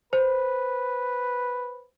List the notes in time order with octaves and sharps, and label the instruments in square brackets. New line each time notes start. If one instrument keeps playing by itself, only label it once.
[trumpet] B4 [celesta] C5